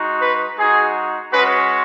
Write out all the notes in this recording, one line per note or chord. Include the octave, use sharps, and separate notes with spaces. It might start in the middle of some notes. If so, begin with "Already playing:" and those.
Already playing: G#3 D#4 F#4
B4
G#3 D#4 F#4 G#4
G#3 C#4 F#4 B4